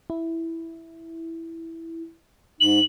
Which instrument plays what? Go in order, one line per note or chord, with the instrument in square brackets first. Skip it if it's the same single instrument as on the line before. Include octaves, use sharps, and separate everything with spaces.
[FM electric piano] E4
[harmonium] G#2 [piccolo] F#7